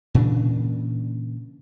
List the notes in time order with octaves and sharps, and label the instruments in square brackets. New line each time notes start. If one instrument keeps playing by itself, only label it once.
[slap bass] A#2 C#3 E3 D4